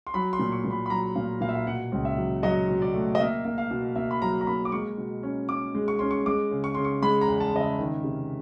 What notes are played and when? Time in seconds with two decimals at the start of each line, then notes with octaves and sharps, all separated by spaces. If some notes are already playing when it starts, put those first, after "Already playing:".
0.07 C6
0.14 F#3 B5
0.33 C6
0.39 A#2
0.52 C#6
0.64 A#2
0.71 B5
0.86 B5
0.90 F#3 A#5
1.16 A#2 F5
1.41 A#2 F5
1.49 E5
1.55 F5
1.67 B2 F#5
1.92 C#2
2.05 E5
2.17 F#3
2.43 F#3 D#5
2.68 B2
2.82 D5
2.94 A3
3.15 D#5
3.20 A#3 E5
3.45 A#3
3.58 F5
3.71 B2
3.96 A#3 E5
4.11 B5
4.22 F#3 A#5
4.41 A#5
4.47 A#3 B5
4.65 D6
4.72 G#3 C#6
4.98 B2
5.23 C#4
5.49 C#4 D6
5.75 G#3
5.88 C#6
5.99 C#4 C6
6.11 C#6
6.26 G#3 D6
6.51 C#3
6.64 C#6
6.75 C#3 C6
6.85 C#6
7.02 G#3 B5
7.21 A#5
7.27 E2
7.40 A5
7.54 C#3 D#5
7.60 E5
7.79 D#3
8.04 C3